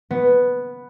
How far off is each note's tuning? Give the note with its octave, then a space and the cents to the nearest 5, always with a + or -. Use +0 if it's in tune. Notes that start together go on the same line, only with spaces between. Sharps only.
B3 +0